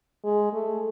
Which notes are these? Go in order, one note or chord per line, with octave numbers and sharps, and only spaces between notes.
G#3
A3